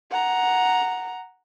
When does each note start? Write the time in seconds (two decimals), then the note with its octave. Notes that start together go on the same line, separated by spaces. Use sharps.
0.11 F#5 A#5